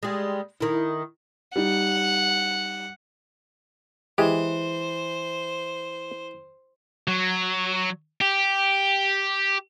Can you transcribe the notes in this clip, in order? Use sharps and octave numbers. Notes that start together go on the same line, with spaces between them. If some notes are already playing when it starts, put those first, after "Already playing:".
G3 G#3
D#3 E4
G3 D#4 F#5
E3 G#3 G4 C5
F#3
G4